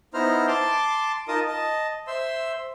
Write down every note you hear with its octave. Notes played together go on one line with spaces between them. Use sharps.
B3 D#4 E4 C5 A#5 F6
A5 C6 D6
D#4 F4 A#4 D#5 A5 D#6
D#5 A5
C5 E5 C6 E6